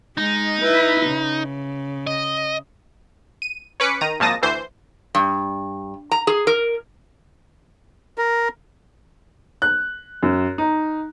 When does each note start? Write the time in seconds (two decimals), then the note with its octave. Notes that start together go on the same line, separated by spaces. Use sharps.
0.17 G#3 D#4
0.61 E4 B4
1.06 C#3
2.07 D#5
3.42 D#7
3.80 C#4 B4 D6 B6 C#7
4.01 D#3 A#5 D#7
4.20 G#1 A#2 F3 A5 D#6 A#6
4.42 D2 E3 C5 G6
5.15 G2
6.12 A#5
6.27 G#4
6.47 A#4
8.18 A#4
9.62 F#6
10.23 F#2
10.58 D#4